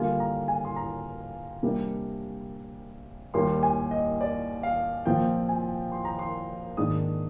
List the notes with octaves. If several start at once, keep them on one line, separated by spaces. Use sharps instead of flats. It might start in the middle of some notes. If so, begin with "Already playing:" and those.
Already playing: D3 G3 A#3 F4 G#5
A#5
G#5
C6
A#5
C3 G3 A#3 D4
D#2 D#3 G3 A#3 C6
G#5
D#5
D5
F5
A#2 F3 C4 F4 G5
G#5
C6
A#5
C6
G#2 D#3 A#3 D4 D#6